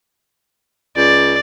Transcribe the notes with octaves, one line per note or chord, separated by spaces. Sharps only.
C#2 D5